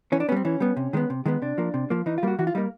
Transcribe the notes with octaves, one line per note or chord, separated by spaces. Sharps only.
E3 C#4
D4
B3 C#4
G3 C4
E3 C#4
G3 B3
C3
D#3 G#3 B3
C3
D#3 G#3 B3
C3 D4
F3 A#3
C3
F3 A#3
E3 D#4
F4
G3 A#3 F#4
E3 F#4
F4
G3 A#3 D#4